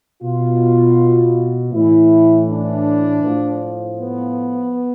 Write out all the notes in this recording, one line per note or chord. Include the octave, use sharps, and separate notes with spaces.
B2 F4
A2 E3 E4
D4
A2 F3
B3